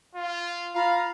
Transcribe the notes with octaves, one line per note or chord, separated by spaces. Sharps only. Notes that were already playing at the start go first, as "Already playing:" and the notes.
F4
F4 F5 A#5 B5